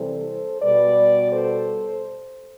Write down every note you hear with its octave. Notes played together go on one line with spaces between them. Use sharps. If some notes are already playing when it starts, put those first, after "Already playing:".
Already playing: C3 E3 G3 A4 C5
B2 G3 B4 D5
A4 C5